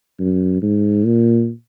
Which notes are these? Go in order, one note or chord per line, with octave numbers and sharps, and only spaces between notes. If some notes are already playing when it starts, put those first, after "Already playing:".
F#2
G#2
A#2